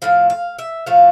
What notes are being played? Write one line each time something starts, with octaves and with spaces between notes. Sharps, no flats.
A2 F3 A3 F5
F5
E5
A2 F3 A3 F5